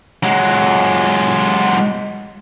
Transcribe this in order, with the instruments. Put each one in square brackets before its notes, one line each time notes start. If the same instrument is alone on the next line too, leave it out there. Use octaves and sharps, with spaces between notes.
[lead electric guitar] F#3 G#3